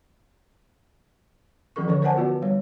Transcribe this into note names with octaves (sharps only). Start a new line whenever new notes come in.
E3 F3 C#4 G#4 A#4 C#6
D3 A4 C#5 D5 C#6
A#4 C5 D5 F#5 G#5 A5
B3 F4 F#4 B4 D5
G3 C#5